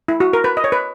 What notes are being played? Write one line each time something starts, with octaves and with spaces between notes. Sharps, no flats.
E4
F#4
A#4
B4
D#5
C#5
B4